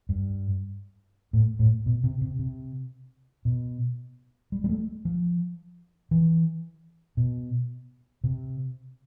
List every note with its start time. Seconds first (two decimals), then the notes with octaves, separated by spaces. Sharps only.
0.09 G2
1.33 A2
1.59 A2
1.86 B2
2.04 C3
2.21 C3
2.39 C3
3.45 B2
4.52 G3
4.64 G3
4.69 A3
5.05 F3
6.11 E3
7.17 B2
8.24 C3